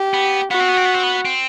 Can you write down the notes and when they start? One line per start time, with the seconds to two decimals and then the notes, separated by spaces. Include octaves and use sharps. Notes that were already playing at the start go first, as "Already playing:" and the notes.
Already playing: G4
0.14 B3
0.51 B3 F#4
0.60 C4
0.69 B3
0.77 C4
0.85 B3
0.94 C4
1.03 B3
1.25 C4